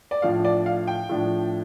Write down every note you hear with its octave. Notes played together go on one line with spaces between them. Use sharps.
D5
A2 F3 D4 F5
D5
F5
G5
A2 F3 D4